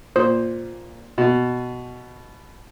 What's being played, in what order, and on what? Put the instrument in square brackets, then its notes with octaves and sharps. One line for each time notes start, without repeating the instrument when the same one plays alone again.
[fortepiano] A#2 [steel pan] C5
[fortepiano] B2